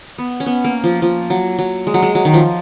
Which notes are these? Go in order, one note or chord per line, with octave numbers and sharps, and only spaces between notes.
B3
C#4
B3
A#3
F3
F3
F#3
F#3
G#3
F#3
G#3
F#3
D#3
F3